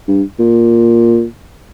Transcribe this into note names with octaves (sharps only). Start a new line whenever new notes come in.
G2
A#2